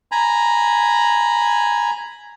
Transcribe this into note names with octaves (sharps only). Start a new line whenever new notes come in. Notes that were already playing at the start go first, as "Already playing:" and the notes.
G#5 A#5 B5